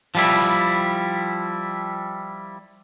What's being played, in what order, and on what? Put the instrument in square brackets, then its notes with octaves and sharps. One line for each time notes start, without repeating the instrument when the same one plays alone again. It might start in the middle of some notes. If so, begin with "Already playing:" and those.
[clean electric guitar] F3 G3 E4